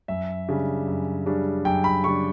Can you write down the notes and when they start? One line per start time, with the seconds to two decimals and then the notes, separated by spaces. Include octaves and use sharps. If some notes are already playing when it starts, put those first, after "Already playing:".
0.08 F#2 E5
0.48 C#3 G3 D4
0.87 F#2
1.26 C#3 G3 D4
1.65 F#2 G5
1.84 B5
2.04 C#3 G3 D4 C#6